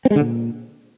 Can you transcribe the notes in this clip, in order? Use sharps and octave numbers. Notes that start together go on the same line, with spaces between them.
C4
G#3
D3
A#2